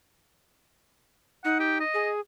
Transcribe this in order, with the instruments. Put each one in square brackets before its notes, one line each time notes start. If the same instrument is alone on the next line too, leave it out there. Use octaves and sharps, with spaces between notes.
[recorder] D#4 [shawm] F#5
[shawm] G4
D#5
[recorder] G#4